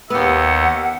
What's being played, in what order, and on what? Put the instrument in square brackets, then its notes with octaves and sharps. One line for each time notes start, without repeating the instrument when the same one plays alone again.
[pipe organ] D#2 [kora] B3 G4 [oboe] E5 [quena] F#5